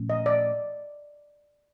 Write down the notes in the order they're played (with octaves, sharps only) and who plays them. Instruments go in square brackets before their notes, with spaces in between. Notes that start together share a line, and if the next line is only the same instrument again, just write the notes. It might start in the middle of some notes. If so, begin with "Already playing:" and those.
Already playing: [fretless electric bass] A#2 F3 A3 C#4
[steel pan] D#5
D5